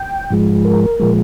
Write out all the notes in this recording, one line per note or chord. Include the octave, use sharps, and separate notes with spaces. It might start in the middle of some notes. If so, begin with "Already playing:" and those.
Already playing: G5
G#2 F3 G#3
A#4
A#2 F3 G#3